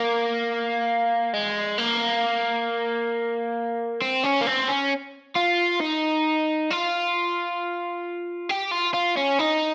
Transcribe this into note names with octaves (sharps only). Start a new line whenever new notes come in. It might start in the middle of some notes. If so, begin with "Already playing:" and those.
Already playing: A#3
G#3
A#3
C4
C#4
A#3
C4
C#4
F4
D#4
F4
G4
F4
F4
C#4
D#4